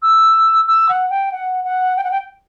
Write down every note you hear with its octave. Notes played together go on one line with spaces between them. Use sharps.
E6
E6
F#5
G5
F#5
F#5
G5
F#5
G5